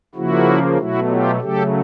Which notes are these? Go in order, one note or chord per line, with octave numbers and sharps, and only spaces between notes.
C#3 F3 A#3 E4 F#4
B2 F#3 A3 E4 F#4
F4 G4
C#3 F#3 A3 G4 A4